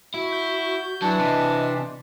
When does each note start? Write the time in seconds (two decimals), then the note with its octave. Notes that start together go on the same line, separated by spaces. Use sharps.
0.14 E4 F#4
0.32 G6
1.02 E3 F#3 D4 A5
1.19 C3 D#5